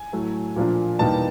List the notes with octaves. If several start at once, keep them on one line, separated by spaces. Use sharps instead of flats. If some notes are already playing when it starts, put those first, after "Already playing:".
Already playing: G#5
A2 F#3 A3
A#2 F3 A#3 D4
E2 B2 G3 A#3 D#4 A5